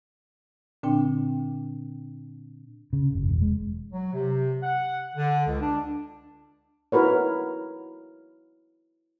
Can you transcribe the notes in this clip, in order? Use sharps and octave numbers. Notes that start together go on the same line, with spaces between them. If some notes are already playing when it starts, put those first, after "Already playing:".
A#2 D3 C4 D4 G5
C#3
F#1
E1
G#3
F#3
C3
F#5
D3
C#2
D4
E4 F#4 A#4 B4 C#5